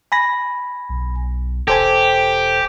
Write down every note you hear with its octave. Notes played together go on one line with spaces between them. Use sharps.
G#5 B5 A#6
B1
E1 G4 A4 C5 G#5